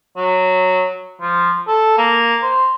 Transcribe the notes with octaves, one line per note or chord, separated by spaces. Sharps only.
F#3
F3
A4
A#3
C5